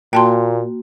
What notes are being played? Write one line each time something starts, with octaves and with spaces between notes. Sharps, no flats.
A#2 A#3 F#4 G5 A5 C6